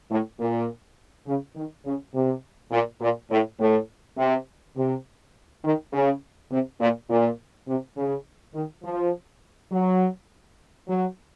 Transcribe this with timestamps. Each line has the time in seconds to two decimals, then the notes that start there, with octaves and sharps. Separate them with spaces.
0.11 A2
0.40 A#2
1.27 C#3
1.56 D#3
1.85 C#3
2.14 C3
2.72 A#2
3.01 A#2
3.31 A2
3.59 A2
4.18 C3
4.77 C3
5.64 D#3
5.92 C#3
6.51 C3
6.80 A#2
7.09 A#2
7.67 C3
7.97 C#3
8.54 D#3
8.84 F3
9.71 F#3
10.88 F#3